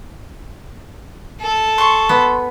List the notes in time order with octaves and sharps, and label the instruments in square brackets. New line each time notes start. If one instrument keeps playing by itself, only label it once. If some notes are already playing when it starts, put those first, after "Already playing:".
[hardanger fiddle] A4
[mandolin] C6 C#6
[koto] B3